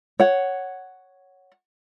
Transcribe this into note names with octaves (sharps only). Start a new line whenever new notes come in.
C#5 F#5